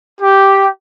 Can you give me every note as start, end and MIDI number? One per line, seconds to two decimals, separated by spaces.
0.21 0.68 67